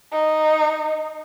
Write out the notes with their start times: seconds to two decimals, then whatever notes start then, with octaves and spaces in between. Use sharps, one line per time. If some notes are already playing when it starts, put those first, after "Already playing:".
0.12 D#4